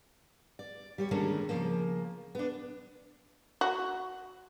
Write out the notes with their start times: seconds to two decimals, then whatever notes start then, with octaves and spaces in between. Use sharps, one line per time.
0.59 D5
0.98 G3 G4 C#5
1.11 D3 D#3 G3 G#3 A#3 C#4
1.49 C#3 F3 A#3
2.35 B3 D4
3.61 F#4